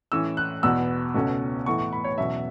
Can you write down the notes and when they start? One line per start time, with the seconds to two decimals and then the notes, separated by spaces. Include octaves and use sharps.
0.12 A2 E3 C#4 E6
0.37 F#6
0.63 E2 B2 B3 E6
1.15 C#2 B2 A3 C#4
1.66 A2 E3 B3 C#6
1.79 C#6
1.93 B5
2.04 C#5
2.18 E2 B2 F#3 C#4 E5